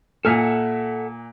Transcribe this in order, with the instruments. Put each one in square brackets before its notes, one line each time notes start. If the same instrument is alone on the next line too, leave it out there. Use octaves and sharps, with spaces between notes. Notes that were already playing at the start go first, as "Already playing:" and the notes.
[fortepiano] A#2 G#5 F6 [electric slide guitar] A4 E5 F#5